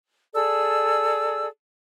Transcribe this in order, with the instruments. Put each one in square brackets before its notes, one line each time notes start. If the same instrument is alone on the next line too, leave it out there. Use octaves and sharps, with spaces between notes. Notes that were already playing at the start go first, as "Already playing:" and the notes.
[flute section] G#4 A4 D5 E6